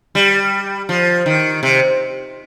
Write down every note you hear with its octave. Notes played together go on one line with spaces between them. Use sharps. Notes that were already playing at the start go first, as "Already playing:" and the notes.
G3
F3
D#3
C3